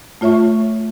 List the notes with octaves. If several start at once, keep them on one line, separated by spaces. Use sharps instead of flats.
A3 F4 C#5 E5 C#6